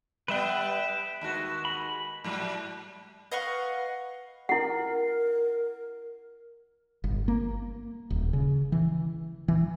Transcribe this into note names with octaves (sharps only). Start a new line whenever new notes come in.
G3 B3 B4 E5 G5
D#2 G#3 F#4
B5
G#2 F#3 G3
B4 D#5 F5 F#5 C#6
E4 A#4 F#5
G1
A#3
D#1
C#3
E3
E3